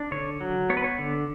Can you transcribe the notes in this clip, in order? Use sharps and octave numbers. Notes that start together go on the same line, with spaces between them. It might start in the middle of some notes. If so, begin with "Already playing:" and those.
Already playing: D4
D3 C#5
F#3
B3 C#5
B4
C#5
D3